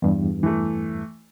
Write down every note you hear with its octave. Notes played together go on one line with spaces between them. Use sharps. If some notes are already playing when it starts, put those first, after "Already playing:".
E2 G2
E3 A3